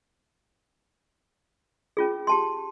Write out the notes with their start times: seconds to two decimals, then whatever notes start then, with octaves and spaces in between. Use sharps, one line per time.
1.97 C#4 F4 G#4
2.27 G4 A5 C6